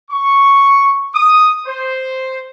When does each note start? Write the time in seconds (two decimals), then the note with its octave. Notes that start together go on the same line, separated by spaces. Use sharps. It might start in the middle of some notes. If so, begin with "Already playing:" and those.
0.10 C#6
1.14 D#6
1.66 C5